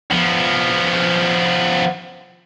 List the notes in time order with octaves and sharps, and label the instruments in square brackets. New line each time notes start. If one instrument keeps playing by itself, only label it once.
[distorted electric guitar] F3 B3